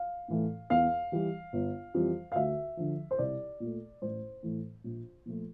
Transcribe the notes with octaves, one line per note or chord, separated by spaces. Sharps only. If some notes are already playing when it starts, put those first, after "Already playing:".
Already playing: F5
A2 E3 A3
E2 F5
E3 G3
G1
F2 E3 G3
F5
D2 E5
D3 F3
C5
C2 D5
A#2 A3
A1 C5
A2 E3 A3
A#1
A#2 F3 A3